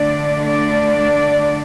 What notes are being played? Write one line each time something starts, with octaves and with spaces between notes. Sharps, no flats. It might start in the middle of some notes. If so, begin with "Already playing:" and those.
Already playing: D3 A3 D4 D5
D5